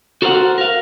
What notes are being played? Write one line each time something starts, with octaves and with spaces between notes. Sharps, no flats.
F#4 A4 A#4 C5 D#5 F#5
A#4 F5